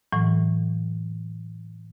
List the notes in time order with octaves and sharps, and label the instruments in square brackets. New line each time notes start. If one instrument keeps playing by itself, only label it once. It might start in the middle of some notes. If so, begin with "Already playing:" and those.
[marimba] A2 E3 F#3